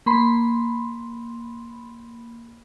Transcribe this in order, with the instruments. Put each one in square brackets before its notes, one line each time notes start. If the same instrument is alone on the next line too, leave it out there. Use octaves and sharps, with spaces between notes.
[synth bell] A#3 B5 C6